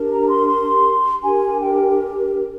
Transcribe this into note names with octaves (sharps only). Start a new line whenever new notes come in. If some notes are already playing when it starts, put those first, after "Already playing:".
Already playing: D4 G4 A#4
A#5
C6
C6
D4 G4 A#4 G#5
G5